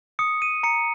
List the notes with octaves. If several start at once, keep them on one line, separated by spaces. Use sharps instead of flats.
D#6 C#7
D#7
A#5 C#7